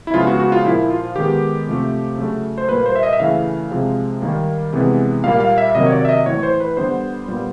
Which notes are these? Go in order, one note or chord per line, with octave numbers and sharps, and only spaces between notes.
E4
C#3 F3 G#3 B3 F4
F#4
F#4
F4
A#2 F3 A#3 E4
F4
D#3 G#3 B3 G4
C3 F3 A3
C#3 F#3 A3
C5
A#2 G3 A#3 B4
C5
E5
D#5
E5
C#3 E3 A3 F5
C3 F3 G#3
D#3 G3 A#3
C3 E3 G#3 B3
A#2 G3 A#3 F5
F5
E5
C3 D#3 F#3 A#3 D#5
C#5
D5
E5
D#5
A2 E3 A3 C#5
C#5
C5
B4
D3 G3 B3 C5
A#2 G3 B3